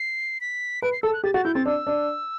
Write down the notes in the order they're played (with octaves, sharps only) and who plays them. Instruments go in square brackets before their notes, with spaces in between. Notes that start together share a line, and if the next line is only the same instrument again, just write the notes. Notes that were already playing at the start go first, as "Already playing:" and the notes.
Already playing: [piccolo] C7
B6
[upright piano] B4 [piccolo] D7
[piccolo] C7
[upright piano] A4 [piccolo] E6
[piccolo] F#6
[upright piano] G4 [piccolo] A6
[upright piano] F#4 [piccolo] A6
[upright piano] E4 [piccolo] G6
[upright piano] C4 [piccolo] A6
[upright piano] D4 [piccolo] E6
[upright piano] D4